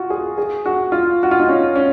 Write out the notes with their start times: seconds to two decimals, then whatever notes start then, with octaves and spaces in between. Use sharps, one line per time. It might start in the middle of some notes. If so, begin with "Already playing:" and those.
Already playing: F4 F#4
0.10 G#4
0.38 G#4
0.66 F#4
0.92 F4
1.23 F#4
1.31 F4
1.39 D#4
1.48 C#4
1.75 C#4